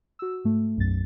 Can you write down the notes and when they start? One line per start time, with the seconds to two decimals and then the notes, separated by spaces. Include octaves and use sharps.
0.19 F#4 E6
0.44 G#2 A3
0.77 B1 F#2 A6